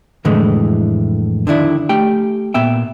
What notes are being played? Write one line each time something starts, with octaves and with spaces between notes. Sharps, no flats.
F2 A2 D3 E3 G#3 A3
D3 D#3 D4 E4
A3 G4 G5
A#2 B3 E5 G5